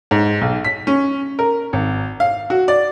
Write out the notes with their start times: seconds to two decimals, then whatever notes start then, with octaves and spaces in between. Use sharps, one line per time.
0.11 G#2
0.41 B1
0.65 B6
0.87 C#4
1.39 A#4
1.73 G#1
2.20 F5
2.50 F#4
2.68 D5